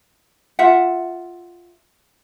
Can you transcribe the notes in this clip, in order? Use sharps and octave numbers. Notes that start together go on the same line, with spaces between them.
F4 E5 F#5